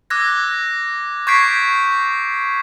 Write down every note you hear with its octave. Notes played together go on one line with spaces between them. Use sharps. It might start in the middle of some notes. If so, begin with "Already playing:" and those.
D6 E6 F#6 G#6 A#6
C#6 G6 G#6 B6 C7 D7